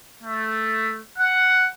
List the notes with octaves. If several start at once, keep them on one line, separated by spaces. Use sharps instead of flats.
A3
F#5